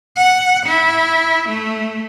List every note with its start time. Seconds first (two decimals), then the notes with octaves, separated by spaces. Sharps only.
0.17 F#5
0.66 E4
1.48 A3